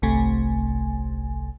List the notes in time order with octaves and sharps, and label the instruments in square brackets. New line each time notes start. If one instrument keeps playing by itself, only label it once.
[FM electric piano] G1 C2 C3 A3 G#5